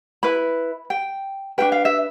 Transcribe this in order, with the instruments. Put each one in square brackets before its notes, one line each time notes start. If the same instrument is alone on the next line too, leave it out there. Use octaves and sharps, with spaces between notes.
[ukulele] E4 B4 B5
G5
D4 F4 B4 G5
F5
E5